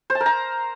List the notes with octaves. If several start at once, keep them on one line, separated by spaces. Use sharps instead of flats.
C5
A5
A#4
A#5